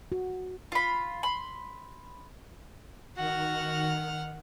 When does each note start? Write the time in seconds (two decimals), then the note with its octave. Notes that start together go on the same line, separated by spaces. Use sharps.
0.12 F#4
0.72 F4 B5
1.23 B5 C6
3.18 D#3 F#4 F#5 F6